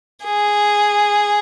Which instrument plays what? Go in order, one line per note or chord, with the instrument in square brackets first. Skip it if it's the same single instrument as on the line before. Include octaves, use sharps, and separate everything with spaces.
[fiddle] G#4